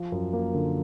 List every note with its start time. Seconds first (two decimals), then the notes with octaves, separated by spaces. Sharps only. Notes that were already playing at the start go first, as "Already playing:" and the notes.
Already playing: F3
0.12 F#2
0.33 A#3
0.54 D3